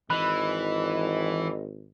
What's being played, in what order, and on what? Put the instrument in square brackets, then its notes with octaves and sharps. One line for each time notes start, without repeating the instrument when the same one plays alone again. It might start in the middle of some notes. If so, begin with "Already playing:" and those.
[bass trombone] G#1 [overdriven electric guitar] E3 [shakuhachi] D#5 [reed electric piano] B5 F#6